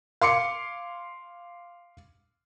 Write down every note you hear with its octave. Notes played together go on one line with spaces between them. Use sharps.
F5 C6 D6 C#7